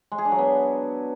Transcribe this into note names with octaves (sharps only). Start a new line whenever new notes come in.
G#3
G#4
D4
F#3
B3